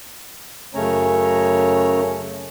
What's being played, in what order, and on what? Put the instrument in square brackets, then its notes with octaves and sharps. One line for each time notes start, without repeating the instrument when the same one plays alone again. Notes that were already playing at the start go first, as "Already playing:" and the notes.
[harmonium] F#2 C#3 A3 C#4 C#5 A#5